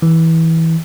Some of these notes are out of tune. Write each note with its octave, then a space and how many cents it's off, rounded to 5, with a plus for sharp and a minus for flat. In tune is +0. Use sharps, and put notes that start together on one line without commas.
E3 -20